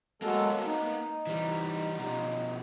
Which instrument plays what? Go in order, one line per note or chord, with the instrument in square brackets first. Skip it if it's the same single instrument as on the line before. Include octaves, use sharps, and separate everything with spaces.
[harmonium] F#3 G#3 A4 [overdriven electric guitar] A#3 B3
[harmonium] D#4
[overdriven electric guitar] E3 G3
[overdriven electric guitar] B2 F3 [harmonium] D#4